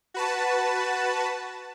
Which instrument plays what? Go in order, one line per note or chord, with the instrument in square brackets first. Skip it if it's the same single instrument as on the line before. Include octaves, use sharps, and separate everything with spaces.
[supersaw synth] F#4 B4 A5